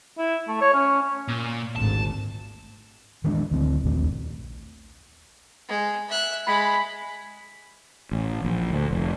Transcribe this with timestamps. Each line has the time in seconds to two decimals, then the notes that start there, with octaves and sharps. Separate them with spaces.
0.18 E4
0.48 A3
0.61 C#5
0.74 C#4
1.28 A#2
1.76 G#1 D2 A#2 A5
3.24 D#3 E3 G#3 D4
3.51 D2 C4
3.84 A#1 D#2 A3 D4
5.68 G#3
6.08 E5 F#6
6.47 G#3 B5
8.12 A1
8.45 A#1
8.70 D2
8.91 F1